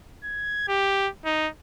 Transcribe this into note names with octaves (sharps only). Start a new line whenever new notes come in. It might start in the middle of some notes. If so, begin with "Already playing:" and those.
G#6
G4
D#4